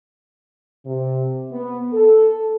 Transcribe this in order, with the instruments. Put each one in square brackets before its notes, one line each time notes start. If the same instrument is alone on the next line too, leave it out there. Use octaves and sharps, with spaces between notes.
[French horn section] C3
B3
A4